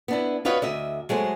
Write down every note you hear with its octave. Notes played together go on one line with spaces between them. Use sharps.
B3 D4 E4
F4 F#4 B4 C#5 D#5
D2 D#5 E5
F#3 G#3 A3 C5